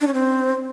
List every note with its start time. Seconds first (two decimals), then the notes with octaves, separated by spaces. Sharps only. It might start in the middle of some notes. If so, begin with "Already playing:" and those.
0.01 D4
0.07 C#4
0.14 C4